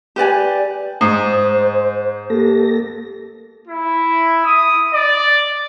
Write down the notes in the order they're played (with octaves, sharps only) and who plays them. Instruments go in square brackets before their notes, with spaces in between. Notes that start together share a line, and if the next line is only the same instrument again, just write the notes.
[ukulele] G4 B4 D5 G#5
[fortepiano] G#2 [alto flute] C5
[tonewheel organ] A#3 A4 A#6 [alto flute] G4
[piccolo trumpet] E4
D#6
D5